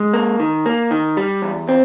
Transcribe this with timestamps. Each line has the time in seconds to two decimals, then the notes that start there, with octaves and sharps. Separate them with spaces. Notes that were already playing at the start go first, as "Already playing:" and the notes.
Already playing: G#3
0.14 A#3
0.40 D#3
0.66 A#3
0.91 D#3
1.17 G3
1.42 E2
1.68 C4